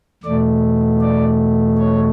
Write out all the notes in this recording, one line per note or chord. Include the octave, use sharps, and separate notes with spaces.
E2 B2 A3 D5
D5
C#5